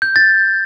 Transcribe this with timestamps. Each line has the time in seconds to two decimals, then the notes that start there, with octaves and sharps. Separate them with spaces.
0.02 G6
0.16 A6